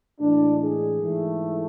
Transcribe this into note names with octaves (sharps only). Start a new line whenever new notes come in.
A2 E3 G#3 D4
G#4
G#2 E3 A3